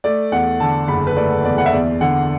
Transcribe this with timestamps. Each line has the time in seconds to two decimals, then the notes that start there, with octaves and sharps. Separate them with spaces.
0.04 A3 D5
0.32 E2 F#5
0.60 D3 A5
0.88 F#1 B5
1.07 B4
1.16 A3 D5
1.44 E2 D5
1.58 F#5
1.66 E5
1.73 E2 D5
2.01 D3 F#5